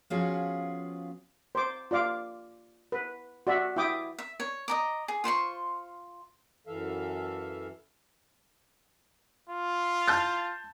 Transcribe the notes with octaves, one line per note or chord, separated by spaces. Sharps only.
F3 B3 C#4 F4 F#4 G#4
C5 D6
F4 D5 F5 D6
B4
F#4 D5 E5
E4 E5 G5 D6 D#6
E5
C#5
D#5 A#5 D6
G#4
F4 C5 C6 C#6
F#2 E3 A4 E5 F5
F4
A5 G6 A6